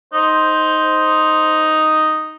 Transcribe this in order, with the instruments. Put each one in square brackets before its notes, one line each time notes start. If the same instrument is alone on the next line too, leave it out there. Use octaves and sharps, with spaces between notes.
[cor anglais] D#4 [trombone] C5